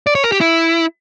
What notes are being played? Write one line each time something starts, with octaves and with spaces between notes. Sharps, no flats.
D5
C#5
A#4
G4
E4